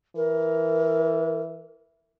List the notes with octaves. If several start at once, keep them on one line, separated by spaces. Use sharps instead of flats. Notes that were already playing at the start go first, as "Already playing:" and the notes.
E3 A#4